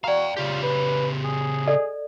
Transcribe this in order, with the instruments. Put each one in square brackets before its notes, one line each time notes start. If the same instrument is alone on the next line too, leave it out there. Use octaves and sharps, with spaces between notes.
[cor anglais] F#4 [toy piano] D5 A#5 [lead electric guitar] F5 G5
[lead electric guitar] C#3 G4 [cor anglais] F4
[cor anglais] B4
G#4
[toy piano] A4 D5 D#5